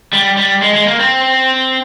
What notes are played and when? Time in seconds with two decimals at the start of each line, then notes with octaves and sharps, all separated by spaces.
0.13 G3
0.37 G3
0.62 G#3
0.74 G#3
0.87 A#3
1.00 C4